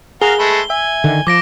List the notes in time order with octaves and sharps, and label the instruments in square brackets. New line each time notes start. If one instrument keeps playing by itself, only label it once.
[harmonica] F#4 A#4 F5 [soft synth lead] G#4 [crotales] G7
[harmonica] G#3 A3 B4
[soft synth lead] E5 [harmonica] G#5
[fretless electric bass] D3 D#3
[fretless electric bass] F3 [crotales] D6 A#6 D7